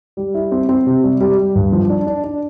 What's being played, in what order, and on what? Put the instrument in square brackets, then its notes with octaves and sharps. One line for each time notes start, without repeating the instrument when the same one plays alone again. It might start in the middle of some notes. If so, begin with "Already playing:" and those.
[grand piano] G3
E4
C4
C4
C3
G3
G3
G3
G2
F3
D4
D4
D4